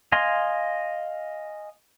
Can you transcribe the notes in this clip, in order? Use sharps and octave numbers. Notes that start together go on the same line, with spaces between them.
D#5 F5 G#5 C6